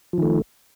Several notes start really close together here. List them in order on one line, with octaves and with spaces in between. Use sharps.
F3 D#3 A3